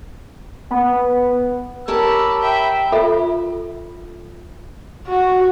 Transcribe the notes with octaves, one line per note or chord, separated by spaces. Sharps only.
B3
G4 A#4 C#5 A5 B5 E6
E5 G5 B5
F4 A4 E5 B5
F#4